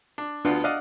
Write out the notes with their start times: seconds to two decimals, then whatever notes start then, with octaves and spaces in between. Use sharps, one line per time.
0.18 D4
0.45 D2 B3 D4 F4
0.64 D5 D#5 F5 F#5